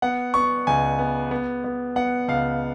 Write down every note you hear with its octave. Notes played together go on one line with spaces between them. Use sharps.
B3 F#5
B3 C#6
C#2 G#5
B3
B3
B3
B3 F#5
C#2 F5